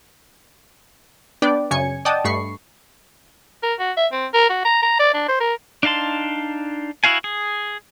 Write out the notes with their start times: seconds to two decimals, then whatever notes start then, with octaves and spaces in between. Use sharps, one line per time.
1.42 B3 D4 B4 D5 G5
1.71 F#2 C#3 C#5 G#5 G#6 C#7
2.05 D5 D#5 F#5 G5 A5 D#6
2.24 G2 A3 B5 C#6 C7
3.63 A#4
3.79 F#4
3.97 E5
4.12 C4
4.34 A#4
4.50 F#4
4.65 A#5
4.82 A#5
5.00 D5
5.14 D4
5.29 C5
5.40 A#4
5.83 D4 D#4 F5 A5 C6
7.04 E4 F#4 F5 G#5
7.24 G#4